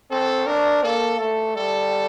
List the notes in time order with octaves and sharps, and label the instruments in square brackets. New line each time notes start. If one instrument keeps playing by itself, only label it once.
[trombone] C4 [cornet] A4
[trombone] D4 [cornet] A#4
[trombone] A#3 [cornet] A4
[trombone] A3 [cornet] A4
[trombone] G3 [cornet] A4